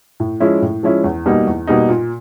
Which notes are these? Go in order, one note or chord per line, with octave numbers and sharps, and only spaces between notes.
A2
F3 G#3 C#4 E4
A2
F3 G#3 C#4 E4
E2
B2 G3 A#3 D#4
E2
B2 G3 A#3 D#4
A#2